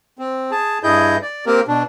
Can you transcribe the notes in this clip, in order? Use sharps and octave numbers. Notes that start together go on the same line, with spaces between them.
C4
G#4 A5
G2 E4 G#4 D#5 G6
D5
A#3 C4 G4 A#4
B2 D4